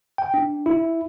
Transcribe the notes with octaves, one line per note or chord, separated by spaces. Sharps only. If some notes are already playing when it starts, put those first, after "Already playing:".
G5
D4
E4